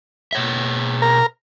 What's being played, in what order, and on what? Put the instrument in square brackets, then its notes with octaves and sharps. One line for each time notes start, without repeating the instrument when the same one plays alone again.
[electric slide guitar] B2 C#5 E5
[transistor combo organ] A#4